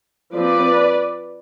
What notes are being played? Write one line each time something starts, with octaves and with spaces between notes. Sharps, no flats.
F3 C4 B4 D5